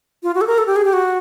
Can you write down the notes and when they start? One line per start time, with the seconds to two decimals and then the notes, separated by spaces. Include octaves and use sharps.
0.23 F4
0.35 F#4
0.41 A4
0.47 A#4
0.58 A4
0.66 G4
0.76 G#4
0.85 G4
0.93 F#4